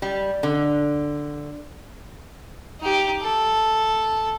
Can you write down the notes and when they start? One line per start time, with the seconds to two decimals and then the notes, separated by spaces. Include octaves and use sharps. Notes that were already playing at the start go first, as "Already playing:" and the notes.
0.02 G3
0.43 D3
2.81 D#4 G4
3.22 A4